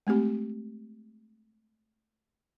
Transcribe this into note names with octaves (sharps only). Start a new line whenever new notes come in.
G#3 A3 C4 G4